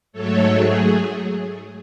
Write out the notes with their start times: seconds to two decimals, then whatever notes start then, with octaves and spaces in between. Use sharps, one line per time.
0.13 G#2 F#3 A3 A4 C#5
0.52 G#4